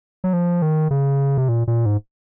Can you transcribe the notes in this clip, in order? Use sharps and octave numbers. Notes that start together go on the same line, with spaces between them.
F#3
F3
D#3
C#3
C3
A#2
A#2
G#2